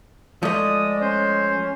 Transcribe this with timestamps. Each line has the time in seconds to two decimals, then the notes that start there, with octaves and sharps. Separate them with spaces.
0.43 F3 G#3 A3 D5 D#6
1.01 C#4 C5